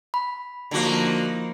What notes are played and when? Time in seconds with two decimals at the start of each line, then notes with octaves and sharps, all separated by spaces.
0.14 B5
0.71 D3 F3 A#3 D#4 F#4